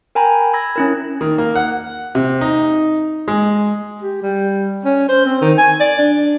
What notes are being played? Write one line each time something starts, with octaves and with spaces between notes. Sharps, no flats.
A#4 G5 G#5 A#5 B5
B5 E6 G#6 A#6
C#4 E4 A#4
D#3
A#3
F#5
C3
D#4
G#3
G4
G3
C#4
C5
C4
D#3
G#5
D5
D4